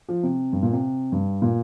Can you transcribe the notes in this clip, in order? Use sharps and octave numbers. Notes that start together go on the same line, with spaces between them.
F3
C3
G2
A#2
C3
G2
A#2